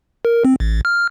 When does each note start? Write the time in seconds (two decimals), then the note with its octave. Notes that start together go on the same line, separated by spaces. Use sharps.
0.25 A#4
0.45 C4
0.60 A1
0.85 F6